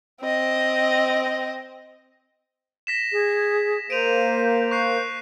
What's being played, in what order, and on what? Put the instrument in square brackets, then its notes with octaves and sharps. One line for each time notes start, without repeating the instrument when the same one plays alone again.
[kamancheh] C4 D#5
[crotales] A#6 B6 E7
[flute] G#4
[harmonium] A#3 [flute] C5 [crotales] D7 D#7 F7
[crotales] C#6 F#6 C7